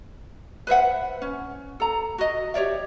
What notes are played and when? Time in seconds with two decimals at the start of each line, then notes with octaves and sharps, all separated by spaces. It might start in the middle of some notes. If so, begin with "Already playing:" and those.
0.67 B4 C5 E5 F#5
1.22 C#4
1.80 A4 A#5
2.18 F#4 D#5
2.54 G4 C#5 D5 E5